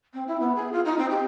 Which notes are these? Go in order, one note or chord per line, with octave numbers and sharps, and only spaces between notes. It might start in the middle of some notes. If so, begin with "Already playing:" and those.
C4
E4
B3
G#4
F4
D#4
C4
G4